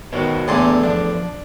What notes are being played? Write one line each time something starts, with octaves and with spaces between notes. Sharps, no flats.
B2 D#3 F#4 C5 C#5
E2 A2 D3 B3 D4 D5 G#5 C6
F3 D4